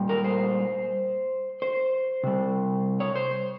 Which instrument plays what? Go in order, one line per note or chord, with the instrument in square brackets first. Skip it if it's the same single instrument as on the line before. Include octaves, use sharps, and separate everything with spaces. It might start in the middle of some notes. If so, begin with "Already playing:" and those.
Already playing: [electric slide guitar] A#2 G3
A#4
C5
C5
C3 G3
C#5
C5